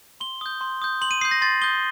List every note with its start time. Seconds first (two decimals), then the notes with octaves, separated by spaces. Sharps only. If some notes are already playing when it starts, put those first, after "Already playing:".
0.20 C6 G7
0.41 D#6 G6
0.61 C6
0.82 D#6 G6
1.01 C6 F#7
1.11 D#7
1.21 D#6 G6 C7
1.31 A#6
1.41 C6 A6
1.62 D#6 G6 G7